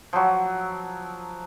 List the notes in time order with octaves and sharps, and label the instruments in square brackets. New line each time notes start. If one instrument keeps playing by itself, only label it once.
[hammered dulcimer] F3 F#3